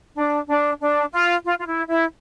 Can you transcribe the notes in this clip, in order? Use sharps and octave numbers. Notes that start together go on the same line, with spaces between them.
D4
D4
D4
F4
F4
F4
E4
E4